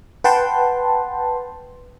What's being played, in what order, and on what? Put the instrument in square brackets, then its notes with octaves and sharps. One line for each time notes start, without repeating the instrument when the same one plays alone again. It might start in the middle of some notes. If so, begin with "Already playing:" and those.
[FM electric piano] B4 F#5 G5 A5 C6